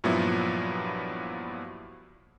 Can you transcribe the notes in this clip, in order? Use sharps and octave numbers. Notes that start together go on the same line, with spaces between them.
G2 A#2 F3 F#3 B3 E4